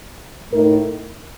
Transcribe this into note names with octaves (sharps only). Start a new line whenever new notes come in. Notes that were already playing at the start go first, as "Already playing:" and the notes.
A2 A3 D#4 A#4